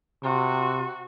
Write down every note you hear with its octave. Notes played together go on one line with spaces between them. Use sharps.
C3 F#4